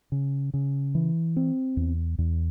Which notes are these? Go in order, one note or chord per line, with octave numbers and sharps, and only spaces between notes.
C#3
C#3
E3
C4
E2
E2